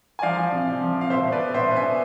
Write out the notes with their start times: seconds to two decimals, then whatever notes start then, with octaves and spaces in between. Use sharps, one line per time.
0.19 G#5
0.22 F3 D5 F5
0.37 F3
0.53 C3
0.67 C3
0.81 F3
0.96 C3
1.01 F5
1.10 B2 C5 E5
1.25 B2
1.32 B4 D5
1.40 B3
1.54 B2 C5 E5
1.69 B2
1.76 E5 G#5
1.83 B3